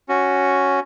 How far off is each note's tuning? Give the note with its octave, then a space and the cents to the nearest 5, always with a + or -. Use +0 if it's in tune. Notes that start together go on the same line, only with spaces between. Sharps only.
C#4 +0 F#4 +0